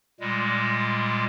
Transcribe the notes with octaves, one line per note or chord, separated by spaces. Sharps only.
A#2 G3 G#3